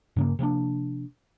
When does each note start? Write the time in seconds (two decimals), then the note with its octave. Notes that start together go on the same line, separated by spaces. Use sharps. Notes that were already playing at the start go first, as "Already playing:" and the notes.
0.16 G2 C#3 A#3
0.39 C3 F3 A#3 D4